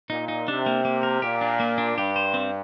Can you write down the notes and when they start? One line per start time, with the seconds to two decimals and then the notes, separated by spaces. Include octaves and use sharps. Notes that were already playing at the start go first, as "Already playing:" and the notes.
0.10 A#2 D#4
0.28 D#4
0.48 C3 D4
0.66 A#3
0.85 A#3
1.03 A#4
1.22 A#2 G4
1.41 D4
1.60 A#3
1.78 D4
1.97 G2 G4
2.16 C5
2.34 C4